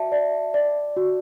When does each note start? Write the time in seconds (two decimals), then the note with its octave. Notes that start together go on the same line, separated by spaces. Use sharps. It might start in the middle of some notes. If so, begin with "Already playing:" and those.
Already playing: F#4 D5 E5 A5
0.12 D5
0.54 D5
0.97 F#4